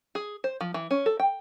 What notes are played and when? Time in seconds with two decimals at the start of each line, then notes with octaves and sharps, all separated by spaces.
0.15 G#4
0.44 C5
0.61 F3
0.74 E3
0.91 C#4
1.06 A4
1.20 G5